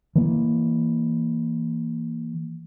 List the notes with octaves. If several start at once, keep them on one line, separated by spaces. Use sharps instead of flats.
E3 A#3